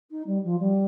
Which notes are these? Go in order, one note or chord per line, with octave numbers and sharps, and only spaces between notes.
D#4
G3
F3
G3